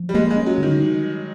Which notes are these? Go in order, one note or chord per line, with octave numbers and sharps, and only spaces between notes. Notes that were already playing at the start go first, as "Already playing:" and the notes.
Already playing: F3
G3
G#3 A#3
G#3
C#4
F#3
D3
D#3